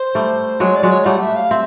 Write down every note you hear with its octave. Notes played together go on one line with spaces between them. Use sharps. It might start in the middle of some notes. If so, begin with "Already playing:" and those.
Already playing: C5
G3 A3
F#3 G#3 C#5
D5
F#3 G#3
C#5
G3 A3 F#5
E5
F5
C4 E5